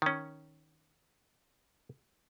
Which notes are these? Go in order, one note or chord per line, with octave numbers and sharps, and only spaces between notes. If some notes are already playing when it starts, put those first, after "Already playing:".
D#3 C#4